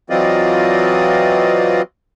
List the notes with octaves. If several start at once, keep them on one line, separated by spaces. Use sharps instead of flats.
E3 F#3 C4 F4 D5 D#5